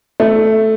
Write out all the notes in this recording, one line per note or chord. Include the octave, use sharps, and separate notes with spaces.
A3